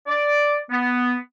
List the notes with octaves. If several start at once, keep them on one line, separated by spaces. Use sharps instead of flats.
D5
B3